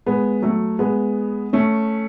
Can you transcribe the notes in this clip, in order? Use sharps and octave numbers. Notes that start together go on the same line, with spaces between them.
G#3 B3
F#3 A3
G#3 B3
A3 C#4